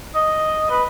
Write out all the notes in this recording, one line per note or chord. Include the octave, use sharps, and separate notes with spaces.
D#5
B4